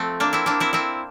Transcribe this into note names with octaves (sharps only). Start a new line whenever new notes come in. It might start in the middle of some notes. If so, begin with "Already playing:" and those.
Already playing: F3 A3 C4
A#3 D4
C4 E4
A#3 D4
C4 E4
C4 E4